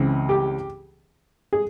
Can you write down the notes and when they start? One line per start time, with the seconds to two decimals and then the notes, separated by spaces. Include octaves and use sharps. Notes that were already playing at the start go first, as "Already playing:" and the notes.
Already playing: C#2 C#3 E3 C4
0.29 G4
1.53 G#4